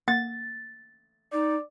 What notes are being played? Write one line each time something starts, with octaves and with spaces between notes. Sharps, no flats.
A#3 F#5 A6
D#4 D5